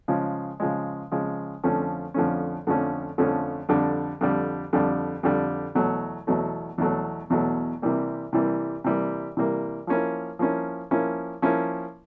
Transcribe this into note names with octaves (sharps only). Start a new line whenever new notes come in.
C#3 F3 G#3
C#3 F3 G#3
C#3 F3 G#3
F2 D3 F3 A3 C#4
F2 D3 F3 A3 C#4
F2 D3 F3 A3 C#4
F2 D3 F3 A3 C#4
F2 D3 G3
F2 D3 G3
F2 D3 G3
F2 D3 G3
E2 B2 F#3 A3
E2 B2 F#3 A3
E2 B2 F#3 A3
E2 B2 F#3 A3
C3 E3 G3 A#3
C3 E3 G3 A#3
C3 E3 G3 A#3
C3 E3 G3 A#3
F3 A#3 C#4 E4
F3 A#3 C#4 E4
F3 A#3 C#4 E4
F3 A#3 C#4 E4